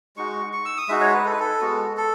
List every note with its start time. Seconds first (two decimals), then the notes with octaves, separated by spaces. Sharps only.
0.16 G#3 D#4 F#4 C#6
0.53 C#6
0.65 E6
0.77 D#6
0.88 G#3 D#4 F#4 E5
1.01 C#5
1.13 B4
1.26 A4
1.32 B4
1.39 A4
1.61 G#3 B3 F#4
1.97 A4